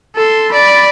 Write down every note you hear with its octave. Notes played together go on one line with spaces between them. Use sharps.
A4 C6
D5 B5